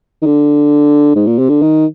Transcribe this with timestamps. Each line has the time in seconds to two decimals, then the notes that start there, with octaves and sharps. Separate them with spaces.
0.22 D#3
0.26 D3
1.15 G#2
1.27 A#2
1.38 C3
1.49 D3
1.62 D#3